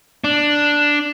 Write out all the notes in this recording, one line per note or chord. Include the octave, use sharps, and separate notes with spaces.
D4